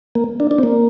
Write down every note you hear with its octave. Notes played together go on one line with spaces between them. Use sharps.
A#3
D4
D4
C4
A#3